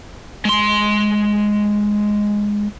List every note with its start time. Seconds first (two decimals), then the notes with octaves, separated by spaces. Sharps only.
0.45 G#3 C6